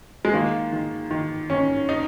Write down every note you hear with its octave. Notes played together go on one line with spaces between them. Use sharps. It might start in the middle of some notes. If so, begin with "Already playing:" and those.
G#3
D#3 A#3
D#3
D#3
D#3 C#4
D#4